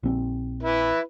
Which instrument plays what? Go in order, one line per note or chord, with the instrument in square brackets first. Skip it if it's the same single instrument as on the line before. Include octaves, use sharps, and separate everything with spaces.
[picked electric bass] A#1 C4
[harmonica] E4 B4